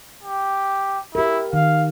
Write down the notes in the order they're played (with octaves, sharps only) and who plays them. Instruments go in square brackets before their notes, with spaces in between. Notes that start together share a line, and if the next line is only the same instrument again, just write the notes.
[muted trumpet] G4
[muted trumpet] E4 [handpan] G4 A#4
[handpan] D#3 [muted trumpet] F5